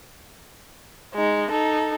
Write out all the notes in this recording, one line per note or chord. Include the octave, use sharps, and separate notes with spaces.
G#3 D#4
D#4 A4